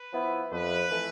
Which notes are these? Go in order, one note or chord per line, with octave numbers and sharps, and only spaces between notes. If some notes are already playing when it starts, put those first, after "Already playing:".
Already playing: B4
F3 B3 E4
F2 B4
E3 A3